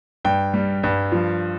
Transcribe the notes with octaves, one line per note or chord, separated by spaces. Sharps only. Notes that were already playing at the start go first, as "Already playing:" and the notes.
G2 G5
G3
G2
F3